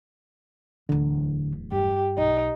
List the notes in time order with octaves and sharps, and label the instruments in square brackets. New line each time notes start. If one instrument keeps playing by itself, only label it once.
[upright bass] D1 E2 [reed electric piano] D3
[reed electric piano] G2 [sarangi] G4
[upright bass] B1 [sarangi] D#4